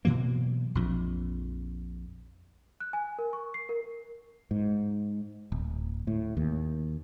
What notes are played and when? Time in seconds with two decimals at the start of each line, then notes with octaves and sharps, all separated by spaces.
0.05 B2 E3 F#3 A#3
0.75 A#1 F2
2.80 F#6
2.93 G#5
3.19 A#4
3.33 C#6
3.54 C7
3.69 A#4
4.51 G#2
5.52 D1
6.07 A2
6.37 D#2